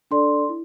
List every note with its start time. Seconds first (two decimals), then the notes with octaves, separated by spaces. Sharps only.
0.11 D4 A4 D5 C6
0.49 E4